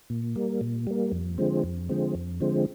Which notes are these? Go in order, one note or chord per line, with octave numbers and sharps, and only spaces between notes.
A#2
G3 A#3
A#2
G3 A#3
F2
D3 F3 G#3 C4
F2
D3 F3 G#3 C4
F2
D3 F3 G#3 C4